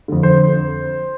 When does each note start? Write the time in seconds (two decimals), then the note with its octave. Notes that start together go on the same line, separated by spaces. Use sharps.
0.08 F2 D3
0.23 C5